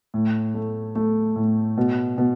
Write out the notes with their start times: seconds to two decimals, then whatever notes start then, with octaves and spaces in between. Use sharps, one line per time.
0.14 A2
0.54 A3
0.95 A3
1.36 A2
1.77 B2
2.18 B2